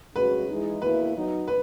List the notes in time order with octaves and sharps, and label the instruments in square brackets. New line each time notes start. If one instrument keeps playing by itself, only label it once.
[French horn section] F#2 C#3 G#3 C#4 F#4 [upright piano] B4
[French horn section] E3 G#3 D#4
[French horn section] E2 B2 A#3 E4 [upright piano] B4
[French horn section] F#3 B3 D#4
[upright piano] B4